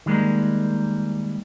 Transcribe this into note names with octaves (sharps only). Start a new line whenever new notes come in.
D#3 G3 G#3 A#3